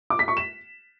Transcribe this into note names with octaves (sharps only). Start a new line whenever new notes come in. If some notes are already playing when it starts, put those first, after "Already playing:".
D6
B6
C#6
E7